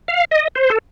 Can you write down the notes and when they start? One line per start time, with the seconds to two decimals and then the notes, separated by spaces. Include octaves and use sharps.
0.08 F5
0.31 D#5
0.55 C5
0.70 A4